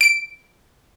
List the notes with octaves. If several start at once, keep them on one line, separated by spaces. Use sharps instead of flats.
D7